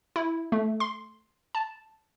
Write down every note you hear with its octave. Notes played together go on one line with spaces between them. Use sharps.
E4
A3
C6
A5